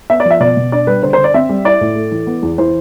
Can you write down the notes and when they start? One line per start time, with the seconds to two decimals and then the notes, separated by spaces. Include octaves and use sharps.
0.10 B3 E5
0.20 D5
0.25 F3
0.31 E5
0.40 B2 D5
0.57 B2
0.72 D4 D5
0.87 G3 B4
1.03 D3 C5
1.13 C5
1.18 D3
1.24 D5
1.34 C4 E5
1.49 G3
1.65 E4 D5
1.81 A2
1.95 A3
2.12 E3
2.27 B3
2.43 E2
2.58 E3 C5